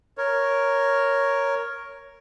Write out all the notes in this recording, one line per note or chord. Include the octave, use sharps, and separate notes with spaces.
A#4 C#5